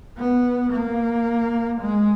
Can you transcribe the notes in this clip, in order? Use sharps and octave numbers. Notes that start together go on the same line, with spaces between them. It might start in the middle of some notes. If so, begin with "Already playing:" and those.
B3
A#3
G#3